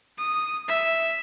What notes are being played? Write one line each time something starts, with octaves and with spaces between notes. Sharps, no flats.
D#6
E5